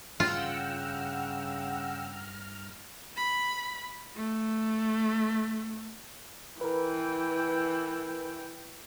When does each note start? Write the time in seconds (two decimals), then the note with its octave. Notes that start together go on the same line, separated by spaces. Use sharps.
0.20 G2 C#3 F4 F#5 G5 A#5 E6 F6
3.16 B5
4.15 A3
6.61 E3 A#4 B4 G5